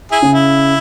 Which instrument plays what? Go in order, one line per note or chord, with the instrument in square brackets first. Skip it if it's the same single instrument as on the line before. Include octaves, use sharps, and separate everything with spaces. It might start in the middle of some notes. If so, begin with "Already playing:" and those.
[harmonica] E4 G#4
[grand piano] C#3
[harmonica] E4